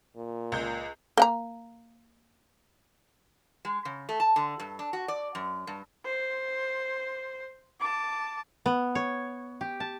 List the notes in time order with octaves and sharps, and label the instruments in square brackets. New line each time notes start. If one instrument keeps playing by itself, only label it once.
[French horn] A#2
[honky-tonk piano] C#2 G6
[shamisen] A#3 F#5 A#5
[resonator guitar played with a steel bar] G#3
C#3
A3
A5
D3
G2
D4
F#4
D5
F#2
G2
[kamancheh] C5
A5 D6
[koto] B3
C#5
G4
A5